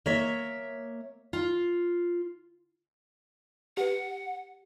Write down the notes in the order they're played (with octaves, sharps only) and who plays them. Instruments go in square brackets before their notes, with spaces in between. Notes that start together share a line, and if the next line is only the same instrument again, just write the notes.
[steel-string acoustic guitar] A#3 C#5 E5
F4
[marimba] G4 B4 [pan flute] F#5